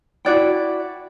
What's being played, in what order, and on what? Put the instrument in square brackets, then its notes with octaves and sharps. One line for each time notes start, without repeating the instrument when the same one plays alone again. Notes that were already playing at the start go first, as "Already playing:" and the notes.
[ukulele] E4 F#4 D5 G5